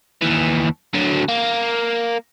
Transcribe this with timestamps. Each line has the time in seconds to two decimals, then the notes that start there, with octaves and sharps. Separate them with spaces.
0.22 D#2 E3
0.94 D3 F#3
1.29 A#3